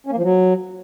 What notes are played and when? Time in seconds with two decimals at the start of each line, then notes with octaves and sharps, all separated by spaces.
0.07 C#4
0.12 A#3
0.17 F3
0.23 F#3